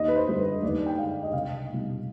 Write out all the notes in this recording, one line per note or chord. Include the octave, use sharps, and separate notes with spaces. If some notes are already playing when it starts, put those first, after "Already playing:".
Already playing: D#2 D#5
B4
C5
D3 G3
B4
D#2 D5
G5
D3 G#3 F5
D#5
C2 F5
B2 G3